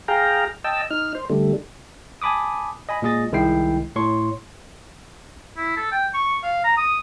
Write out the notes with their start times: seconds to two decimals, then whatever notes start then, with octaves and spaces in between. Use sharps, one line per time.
0.08 G#4 F5 G5 A#5
0.64 D#5 G5 A5 E6
0.90 D#4 F6
1.15 C5
1.30 D3 G3 A3
2.22 G#5 A5 B5 D6 D#6
2.89 D#5 G#5 B5
3.02 A#2 G#3 G#4 D#5 A6
3.32 C2 D#3 G#3 E4 G5 C7
3.96 A2 C#5 C6 C#6
5.57 E4
5.76 A4
5.92 G5
6.14 C#6
6.43 F5
6.64 A#5
6.77 D#6